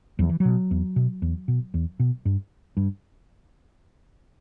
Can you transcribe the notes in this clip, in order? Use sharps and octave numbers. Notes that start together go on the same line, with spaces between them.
E2 F#3
E3
F#3
B2
E2
B2
E2
B2
E2
B2
G2
G2